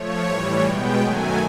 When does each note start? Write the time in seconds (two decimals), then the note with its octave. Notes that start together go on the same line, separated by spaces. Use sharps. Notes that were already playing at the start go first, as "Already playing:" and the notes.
Already playing: F3 A3 C#5
0.25 A2 E3 G3
0.62 B2 G#3 B3 G5
1.00 F#2 D#3 F#3 A3 G#5